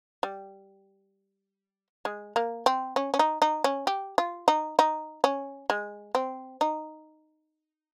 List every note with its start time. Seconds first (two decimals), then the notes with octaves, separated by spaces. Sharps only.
0.23 G3
2.05 G#3
2.36 A#3
2.66 C4
2.96 C#4
3.14 C#4
3.19 D#4
3.42 D#4
3.64 C#4
3.87 G4
4.18 F4
4.48 D#4
4.79 D#4
5.24 C#4
5.70 G#3
6.15 C4
6.61 D#4